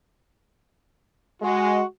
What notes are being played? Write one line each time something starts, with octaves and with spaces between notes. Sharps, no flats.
G#3 F#4